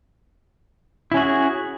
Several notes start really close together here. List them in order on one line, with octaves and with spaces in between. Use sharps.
E4 C#4 F#4 G#4